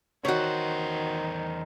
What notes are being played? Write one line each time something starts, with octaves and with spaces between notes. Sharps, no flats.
E2 D#3 F#4 C5 C#5